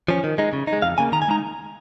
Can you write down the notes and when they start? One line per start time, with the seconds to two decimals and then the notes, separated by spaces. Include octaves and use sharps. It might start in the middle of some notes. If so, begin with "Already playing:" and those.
0.08 F3 C#4
0.24 D#3
0.38 G#3 D#4
0.53 C#3
0.67 D#4
0.73 G#3
0.82 F2 F5
0.98 C#3 A#3 G#5
1.12 D#3 A#5
1.22 G#5
1.28 G#3 D#4 A#5